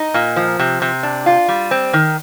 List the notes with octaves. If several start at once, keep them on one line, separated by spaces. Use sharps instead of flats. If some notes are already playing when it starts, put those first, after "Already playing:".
Already playing: D#4
A#2
F3
C3
C3
D4
F4
G3
C4
D#3